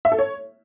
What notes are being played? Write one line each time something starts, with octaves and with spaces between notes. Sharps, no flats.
E5
A4
C#5